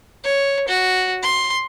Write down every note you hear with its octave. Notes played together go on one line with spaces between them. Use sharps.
C#5
F#4
C6